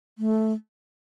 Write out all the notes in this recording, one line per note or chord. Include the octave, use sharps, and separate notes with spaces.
A3